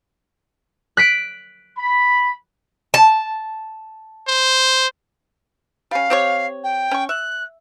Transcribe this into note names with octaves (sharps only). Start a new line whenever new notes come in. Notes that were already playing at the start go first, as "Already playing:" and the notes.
F#6 B6 D7
B5
A5
C5
G3 C#4 F5
C4 G4 C#5
G5
C#4 C#6
E5 F#6